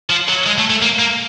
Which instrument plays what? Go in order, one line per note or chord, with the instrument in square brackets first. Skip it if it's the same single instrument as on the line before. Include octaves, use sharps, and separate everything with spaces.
[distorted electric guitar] F3
F#3
G#3
A3
A3
A#3
A#3